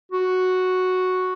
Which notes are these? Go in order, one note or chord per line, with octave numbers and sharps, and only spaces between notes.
F#4